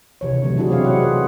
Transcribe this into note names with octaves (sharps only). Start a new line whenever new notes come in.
C3 E3 C#5
D3 E3 F#3 A3
B2 F#3 D4 E4 F#4 G#4
C4 E4 C#5 F5
G#3 G#4 F#5
F4 B4